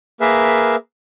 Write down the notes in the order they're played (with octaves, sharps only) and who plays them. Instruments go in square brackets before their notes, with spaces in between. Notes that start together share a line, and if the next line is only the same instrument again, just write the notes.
[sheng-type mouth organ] A#3 G#4 A#4 B4 E5